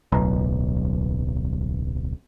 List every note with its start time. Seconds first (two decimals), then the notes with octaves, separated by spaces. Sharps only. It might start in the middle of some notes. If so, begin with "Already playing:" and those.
0.12 D1 B1